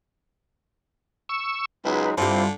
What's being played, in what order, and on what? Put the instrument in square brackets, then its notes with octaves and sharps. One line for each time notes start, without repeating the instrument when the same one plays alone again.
[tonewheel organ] C#6 E6
[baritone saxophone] C#2 [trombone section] F#3 G#3 D#4 [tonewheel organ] B4
[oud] G2 G4 [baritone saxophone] D3 [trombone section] C4 E4 F4 [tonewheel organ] C5